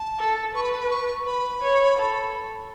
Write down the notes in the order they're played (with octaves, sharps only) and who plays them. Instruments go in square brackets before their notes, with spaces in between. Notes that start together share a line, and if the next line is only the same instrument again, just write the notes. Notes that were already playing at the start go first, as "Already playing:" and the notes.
Already playing: [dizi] A5
[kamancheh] A4
[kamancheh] B4 [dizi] C#6
[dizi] B5
A5
B5
C#6
[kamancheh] B4 [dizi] B5
[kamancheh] C#5
A4